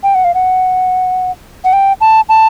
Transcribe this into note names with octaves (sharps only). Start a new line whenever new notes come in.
G5
F#5
F5
F#5
F#5
G5
A5
A5